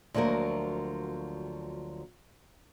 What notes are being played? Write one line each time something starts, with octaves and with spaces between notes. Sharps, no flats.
D2 F3 F#3 A#3 A#4